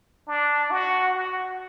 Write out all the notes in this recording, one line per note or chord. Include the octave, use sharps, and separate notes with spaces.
D4
F#4
F#4